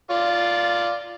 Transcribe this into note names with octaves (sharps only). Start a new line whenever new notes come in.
F4 D5